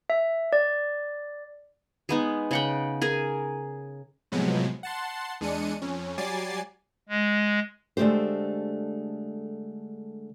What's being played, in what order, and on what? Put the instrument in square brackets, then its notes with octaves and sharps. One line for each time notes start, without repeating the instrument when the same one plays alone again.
[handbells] E5
D5
[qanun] G#3 B3 D#4
C#3 F#5 G5
G#4 A#4
[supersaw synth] A2 C3 F3 F#3 G#3 B3
F#5 A5 C6
E2 G#3 D4 C#7 D#7
F2 C#4
F#3 G3 G#5 D6 A6 C7
[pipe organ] G#3
[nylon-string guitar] D3 G#3 A3 G4 C5